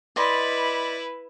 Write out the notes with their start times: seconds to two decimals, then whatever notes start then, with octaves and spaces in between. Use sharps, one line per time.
0.16 E4 B4 D5 D#5 C6